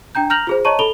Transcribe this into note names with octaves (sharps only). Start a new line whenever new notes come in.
D4 G5 A#5 G6
A#5 F6 G6 A#6 F7 F#7
F4 G#4 C5
C#5 D#5 A5 A#5 C#6 D#7
A4 B5 F7 G7